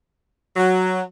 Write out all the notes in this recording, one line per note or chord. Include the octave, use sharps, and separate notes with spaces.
F#3